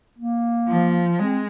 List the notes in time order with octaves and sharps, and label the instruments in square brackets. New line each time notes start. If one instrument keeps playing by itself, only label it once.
[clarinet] A#3
[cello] F3
[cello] G#3 [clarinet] C4